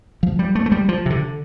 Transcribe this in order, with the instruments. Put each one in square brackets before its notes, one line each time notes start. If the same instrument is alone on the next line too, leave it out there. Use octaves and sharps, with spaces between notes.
[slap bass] F3
G3
A3
A3
G3
F3
C3
D3